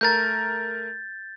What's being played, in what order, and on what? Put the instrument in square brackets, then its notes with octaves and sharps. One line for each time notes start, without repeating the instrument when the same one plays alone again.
[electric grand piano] A3 A#4 A#5 [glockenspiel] G6 A6